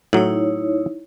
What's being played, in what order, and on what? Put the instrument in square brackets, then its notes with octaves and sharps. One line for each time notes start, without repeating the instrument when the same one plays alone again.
[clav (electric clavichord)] A2 F#3 [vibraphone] D#4 E4 C#5